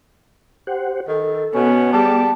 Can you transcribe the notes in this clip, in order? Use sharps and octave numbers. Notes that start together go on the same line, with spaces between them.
G4 C5 F#5
D#3 A4
B2 B3 C#4
G3 G4 G#4 A5 D6